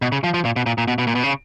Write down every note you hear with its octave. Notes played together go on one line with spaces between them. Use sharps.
B2
C#3
F3
F3
A#2
B2
A#2
A#2
B2
B2
A#2
B2
C#3